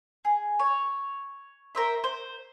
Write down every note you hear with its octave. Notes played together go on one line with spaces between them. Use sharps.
G#4
C#5
A#4 C5 E5
C5